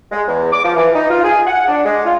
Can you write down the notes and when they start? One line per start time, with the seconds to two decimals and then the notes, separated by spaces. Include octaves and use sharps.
0.12 G#3
0.27 E2
0.52 D6
0.64 F3
0.76 E3
0.94 D#4
1.09 F4
1.24 G#4
1.47 F#5
1.68 D4
1.85 G#3
2.05 F4